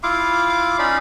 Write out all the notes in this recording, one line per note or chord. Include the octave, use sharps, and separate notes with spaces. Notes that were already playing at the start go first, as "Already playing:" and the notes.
E4 F4 F5 D6
C#4 D#4 D5 B5